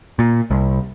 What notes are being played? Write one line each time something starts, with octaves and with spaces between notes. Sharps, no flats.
A#2
C2